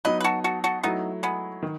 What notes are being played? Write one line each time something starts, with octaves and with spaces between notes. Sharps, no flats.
F#3 B3 D#4 B4 D#5
B4
F#4 A4
F#4 A4
F#4 A4
F#3 A3 B3 D#4 E4
G#3 B3
D#3